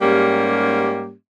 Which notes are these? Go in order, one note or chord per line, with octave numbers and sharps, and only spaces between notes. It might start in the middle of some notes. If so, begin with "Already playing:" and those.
G#2 G3 A#3 C#4 G4